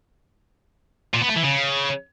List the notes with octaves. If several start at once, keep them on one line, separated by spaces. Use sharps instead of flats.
A#2
B3
A3
E3
C#3